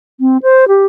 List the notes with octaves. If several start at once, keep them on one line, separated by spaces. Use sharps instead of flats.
C4
C5
G4